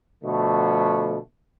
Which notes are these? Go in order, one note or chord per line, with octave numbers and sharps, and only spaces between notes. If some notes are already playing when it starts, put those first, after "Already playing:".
B2 D3 F3 A3